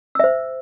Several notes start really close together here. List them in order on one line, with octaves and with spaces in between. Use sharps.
E6 E5 C5